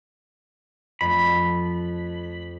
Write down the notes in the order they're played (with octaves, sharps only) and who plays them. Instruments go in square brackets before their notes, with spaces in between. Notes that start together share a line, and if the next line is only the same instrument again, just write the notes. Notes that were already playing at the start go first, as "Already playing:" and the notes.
[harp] F2 A3 [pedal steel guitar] B5